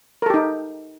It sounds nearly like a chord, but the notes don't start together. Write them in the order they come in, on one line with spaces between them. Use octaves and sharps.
A#4 A4 G4 D#4